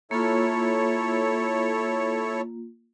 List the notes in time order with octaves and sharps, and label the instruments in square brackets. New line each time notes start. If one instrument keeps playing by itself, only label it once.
[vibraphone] A#3 F4 [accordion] E4 A4 C#5